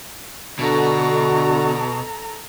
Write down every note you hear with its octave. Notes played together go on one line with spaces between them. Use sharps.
B2 D3 F#4 A4 A#5